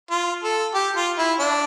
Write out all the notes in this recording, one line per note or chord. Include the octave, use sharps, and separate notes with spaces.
F4
A4
G4
F4
E4
D4